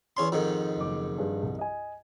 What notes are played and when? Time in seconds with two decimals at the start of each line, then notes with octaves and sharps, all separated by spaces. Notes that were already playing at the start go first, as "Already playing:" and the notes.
0.17 E2 C#4 C6
0.32 F2 G#2 D#3
0.77 F#1 D6
1.18 G2 G#4
1.43 C2
1.59 D#5 G#5